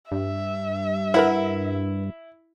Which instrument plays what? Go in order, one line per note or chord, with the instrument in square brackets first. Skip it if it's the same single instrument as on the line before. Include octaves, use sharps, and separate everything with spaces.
[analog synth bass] G2 [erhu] E5
[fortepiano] E4 [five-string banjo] A#4 B4 F#5